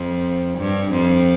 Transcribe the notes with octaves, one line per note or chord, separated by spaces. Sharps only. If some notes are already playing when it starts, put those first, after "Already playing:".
Already playing: F2
G2
F2